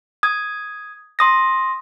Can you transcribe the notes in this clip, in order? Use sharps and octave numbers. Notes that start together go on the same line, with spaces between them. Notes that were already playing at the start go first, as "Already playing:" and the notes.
D#6 G#6
C6 D#6 A#6